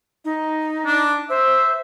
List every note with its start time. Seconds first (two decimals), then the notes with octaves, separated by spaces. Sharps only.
0.25 D#4
0.86 D4
1.30 C5 E5